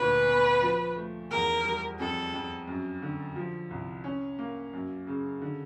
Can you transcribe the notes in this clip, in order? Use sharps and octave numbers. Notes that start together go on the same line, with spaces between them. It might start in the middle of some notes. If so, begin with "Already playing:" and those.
Already playing: D2 A#2 B4
B3
F3
A3
E2 A#4
G3
F2 A4
F2
F#2
D3
F3
C2
C#4
A#3
F#2
C#3
D3